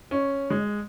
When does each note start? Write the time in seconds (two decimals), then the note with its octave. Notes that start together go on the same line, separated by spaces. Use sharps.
0.11 C#4
0.50 G#3